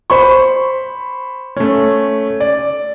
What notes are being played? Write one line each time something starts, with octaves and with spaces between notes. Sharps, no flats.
C5 B5 C#6
A3 C#4
D5